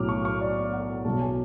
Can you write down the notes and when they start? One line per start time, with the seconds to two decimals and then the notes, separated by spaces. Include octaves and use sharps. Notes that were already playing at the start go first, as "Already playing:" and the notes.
Already playing: B1 A2 F#3 D6 F6
0.09 C#6
0.25 C#6
0.41 D5
0.73 F#5
1.05 B1 B2 F#3 A5
1.21 G#5